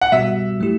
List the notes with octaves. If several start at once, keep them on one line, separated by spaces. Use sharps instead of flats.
F#5
B2 G3 B3 F#4 E5
F#3 A3 E4 G4